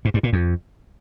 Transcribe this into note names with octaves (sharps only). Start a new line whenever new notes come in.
G#2
G2
A#2
F2